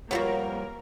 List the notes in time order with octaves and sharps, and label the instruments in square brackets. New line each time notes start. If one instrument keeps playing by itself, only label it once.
[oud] F2 G3 C#5 [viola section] A#3 A#4 [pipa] B3 F4 F#4